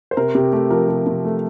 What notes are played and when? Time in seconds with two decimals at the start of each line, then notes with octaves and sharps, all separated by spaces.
0.11 C5
0.17 C3 A#4
0.35 C3 G4
0.52 A3 G4
0.70 F3 A#4
0.88 C3
1.07 C3
1.25 A3